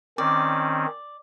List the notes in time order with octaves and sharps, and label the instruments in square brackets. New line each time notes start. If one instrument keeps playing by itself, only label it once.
[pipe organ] D#3 C4 C#4 [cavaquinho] D5